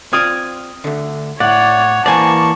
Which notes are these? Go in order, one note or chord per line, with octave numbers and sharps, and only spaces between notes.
C4 F4 D5 D#6 F6 G#6
D2 D3
A2 C#5 D5 F#5
E3 A#3 C5 D5 G#5 A5 C#6